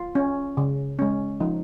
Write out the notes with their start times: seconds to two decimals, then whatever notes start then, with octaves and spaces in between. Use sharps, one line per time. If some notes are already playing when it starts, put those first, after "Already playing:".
Already playing: F4
0.15 C#4
0.57 C#3
0.99 G#3 C#4
1.40 F3 D#4